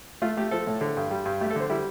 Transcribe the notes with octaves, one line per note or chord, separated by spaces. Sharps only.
A3 F4
A3 G4
F3 A4
A2
D3
G2
G3
G2
A3 G4
A4
D3 C5
G3 E4